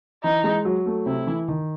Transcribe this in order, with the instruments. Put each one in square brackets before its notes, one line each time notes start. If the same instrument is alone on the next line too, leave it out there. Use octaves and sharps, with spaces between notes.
[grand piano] E3 [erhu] D#4
[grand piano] G#3
F#3
A3
[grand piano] C3 [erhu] E4
[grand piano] E3
D#3